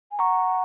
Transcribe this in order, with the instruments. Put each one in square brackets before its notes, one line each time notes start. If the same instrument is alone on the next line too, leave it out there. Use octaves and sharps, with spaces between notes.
[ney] G#5
[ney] F#5 [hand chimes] A#5 C#6